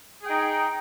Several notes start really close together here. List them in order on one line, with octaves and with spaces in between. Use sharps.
G#4 G5 D#4